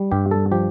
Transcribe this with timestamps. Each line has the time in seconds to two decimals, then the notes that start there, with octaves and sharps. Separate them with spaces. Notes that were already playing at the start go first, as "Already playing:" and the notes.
Already playing: G3
0.12 G2 G4
0.31 A4
0.51 F3 G4